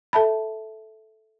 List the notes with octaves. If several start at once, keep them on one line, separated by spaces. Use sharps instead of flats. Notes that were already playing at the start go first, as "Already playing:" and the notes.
A4 E5 A5 B5